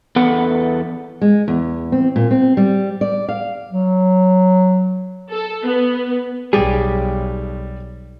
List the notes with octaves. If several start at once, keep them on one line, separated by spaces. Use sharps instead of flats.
E2 B3 A4 B4 F#5
G#3
E2
C4
A#2
C4
G3
D5
F5
F#3
A4
B3
B1 G3 G4 G#4